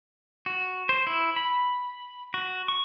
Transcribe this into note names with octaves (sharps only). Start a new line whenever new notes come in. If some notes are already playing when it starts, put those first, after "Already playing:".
F#4
C5
E4
B5
F#4
C#6